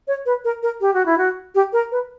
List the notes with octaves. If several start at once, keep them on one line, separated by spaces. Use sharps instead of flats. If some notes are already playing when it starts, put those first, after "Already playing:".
C#5
B4
A#4
A#4
G4
F#4
E4
F#4
G4
A#4
B4